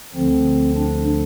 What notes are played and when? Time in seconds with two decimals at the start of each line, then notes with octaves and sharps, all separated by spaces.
0.15 D2 D3 F3 C4
0.76 D4